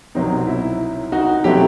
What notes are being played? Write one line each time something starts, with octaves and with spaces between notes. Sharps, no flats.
C2 B2 F#3 C4 D#4
E4
D#4 F#4
B2 F#3 A3 C4 E4 G4